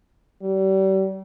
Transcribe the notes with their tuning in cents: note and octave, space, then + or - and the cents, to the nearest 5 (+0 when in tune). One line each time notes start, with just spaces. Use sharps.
G3 -35